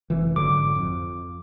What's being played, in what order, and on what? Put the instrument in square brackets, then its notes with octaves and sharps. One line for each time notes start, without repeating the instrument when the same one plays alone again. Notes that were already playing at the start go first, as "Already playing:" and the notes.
[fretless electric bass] F1 E3
[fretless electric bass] G#1 D3 F#3 [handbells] D6
[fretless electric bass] F2